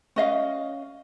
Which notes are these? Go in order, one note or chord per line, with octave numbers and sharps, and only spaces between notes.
C#4 D#5 F5